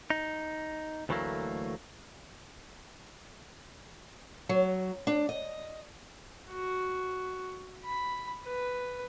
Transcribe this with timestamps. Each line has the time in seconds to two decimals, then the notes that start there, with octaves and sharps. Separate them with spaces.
0.10 D#4
1.09 D2 E3 F#3 A3 A#3
4.49 F#3
5.07 D4
5.29 D#5
6.50 F#4
7.85 B5
8.45 B4